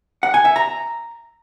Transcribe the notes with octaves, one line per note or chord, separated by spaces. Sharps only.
F#5
G#5
E5
A#5